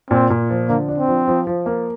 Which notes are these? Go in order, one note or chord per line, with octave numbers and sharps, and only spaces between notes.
A#2 C4
A#2
F3
D3 A#3
D4
C4
F3
F3
F3
A#3